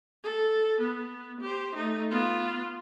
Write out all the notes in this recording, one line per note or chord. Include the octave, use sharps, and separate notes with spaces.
A4
B3
G4 C5
A3 D#4
B3 F4